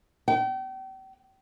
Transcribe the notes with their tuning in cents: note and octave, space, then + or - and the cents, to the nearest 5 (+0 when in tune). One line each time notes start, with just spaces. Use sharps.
G5 -35